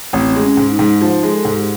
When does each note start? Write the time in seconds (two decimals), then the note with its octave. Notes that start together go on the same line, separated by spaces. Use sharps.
0.13 A1 C4
0.35 G#3
0.42 C#4
0.57 G#2
0.71 D#4
0.79 G#2
1.02 F3 D#4
1.23 G#3
1.31 A4
1.45 G#2
1.52 G4
1.60 G#4